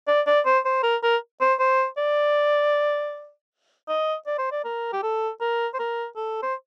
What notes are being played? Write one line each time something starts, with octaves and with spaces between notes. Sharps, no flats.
D5
D5
C5
C5
A#4
A#4
C5
C5
D5
D#5
D5
C5
D5
A#4
G4
A4
A#4
C5
A#4
A4
C5